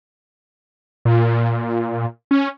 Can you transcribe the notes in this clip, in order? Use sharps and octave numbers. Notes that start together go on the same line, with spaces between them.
A#2
C#4